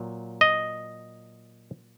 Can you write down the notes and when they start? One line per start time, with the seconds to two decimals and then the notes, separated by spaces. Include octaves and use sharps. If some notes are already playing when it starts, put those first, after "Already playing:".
Already playing: A#2 F#3
0.41 D#5